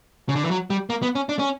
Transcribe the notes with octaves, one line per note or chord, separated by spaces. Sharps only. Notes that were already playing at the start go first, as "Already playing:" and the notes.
C#3
D3
E3
F#3
G3
A#3
B3
C#4
D4
C#4